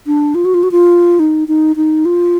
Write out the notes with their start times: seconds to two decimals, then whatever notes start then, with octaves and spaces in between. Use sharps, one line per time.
0.07 D4
0.35 F4
0.45 F#4
0.54 F4
0.63 F#4
0.71 F4
1.19 D#4
1.48 D#4
1.76 D#4
2.05 F4